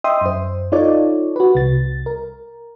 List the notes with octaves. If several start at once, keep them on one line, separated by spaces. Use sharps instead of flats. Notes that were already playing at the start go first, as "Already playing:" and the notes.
D#5 E5 G5 C6 D#6
F#2 C5
D#4 F4 A4 C#5 D5
F#4 B4
C2 A6
A#4